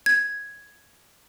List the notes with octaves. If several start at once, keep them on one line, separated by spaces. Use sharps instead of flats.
G#6